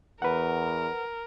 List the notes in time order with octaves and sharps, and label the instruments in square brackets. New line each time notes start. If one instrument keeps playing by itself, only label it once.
[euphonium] E2 [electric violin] A#4 [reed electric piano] B4 F#5